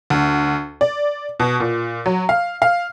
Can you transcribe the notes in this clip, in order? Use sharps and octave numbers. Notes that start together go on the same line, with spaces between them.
D2
D5
B2
A#2
F#3
F5
F5